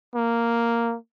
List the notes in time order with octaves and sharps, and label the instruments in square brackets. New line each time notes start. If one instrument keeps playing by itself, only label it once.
[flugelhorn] A#3